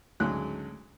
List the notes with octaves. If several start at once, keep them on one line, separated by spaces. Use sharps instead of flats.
D2 G#2 C#3 F#3 F#6